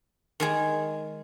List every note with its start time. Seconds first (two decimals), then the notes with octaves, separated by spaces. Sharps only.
0.40 D#3 G#3 G#4